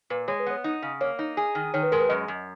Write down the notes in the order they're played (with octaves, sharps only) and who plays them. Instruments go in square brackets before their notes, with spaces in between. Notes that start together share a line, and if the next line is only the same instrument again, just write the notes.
[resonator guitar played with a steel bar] A#2 [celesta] B4
[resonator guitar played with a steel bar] G#3 [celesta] C#5
[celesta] B4
[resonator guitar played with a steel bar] B3 [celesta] C#5
[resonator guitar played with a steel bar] D#4
C#3
[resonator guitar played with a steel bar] A#3 [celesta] C#5
[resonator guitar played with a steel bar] D#4
G#4
D#3
[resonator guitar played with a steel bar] D#3 [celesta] C#5
[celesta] B4
[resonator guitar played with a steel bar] G#3 [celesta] A#4
[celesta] B4
[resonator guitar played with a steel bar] F#2 [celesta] D#5
[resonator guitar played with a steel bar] F#2